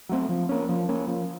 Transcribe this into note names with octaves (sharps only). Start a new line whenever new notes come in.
F#3 A3 C4
F3
A#3 C#4
F3
A#3 C#4
F3